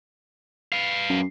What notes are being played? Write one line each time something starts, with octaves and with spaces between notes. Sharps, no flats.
B4 F5
F#2